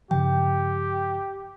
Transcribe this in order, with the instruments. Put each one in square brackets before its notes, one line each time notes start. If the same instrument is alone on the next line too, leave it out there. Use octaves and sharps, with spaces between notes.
[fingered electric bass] G2 C#3 F3 [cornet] G4 [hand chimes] G5